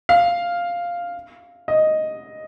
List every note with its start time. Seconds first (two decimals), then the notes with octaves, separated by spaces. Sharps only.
0.09 F5
1.68 D#5